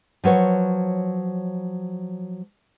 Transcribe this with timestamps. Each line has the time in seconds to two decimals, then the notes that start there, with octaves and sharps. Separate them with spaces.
0.24 F3 F#3 B4 C#5